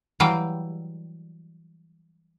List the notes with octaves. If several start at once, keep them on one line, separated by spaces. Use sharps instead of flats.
E3 F#3 G3 F5 G5